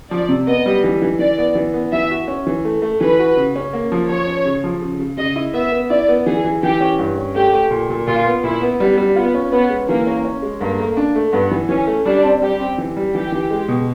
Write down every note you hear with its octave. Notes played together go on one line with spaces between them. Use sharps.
F3 D5
C3
B3 D#5
G3
E3
E3
E3 D5
B3
E3
B3
E3 E5
F#4
C#4
E3
A3
A3
E3 B4
F#4
C#3
C#4
A#3
F3
F3 C#5
C#4
C#3
F3
C#3
C#3
C#3 D#5
E4
B3 E5
B3
E4 D5
B3
E3 G#4
E3
E3 G4
C#4
G2
C#4
A3 G4
A3
A#2
A#2
A#2 F4
B3
A#2 E4
B3
G3 B3
G3
B3 F4
C#4
B3 C#4
G#3
E3 A#3
C#4
C#4
G#3
G2 A#3
A3
D4
A3
G2 B3
E3
E3 C#4
A3
G3 D4
C4
G3 G4
C4
E3
G3
E3 G4
E3
G#3
B2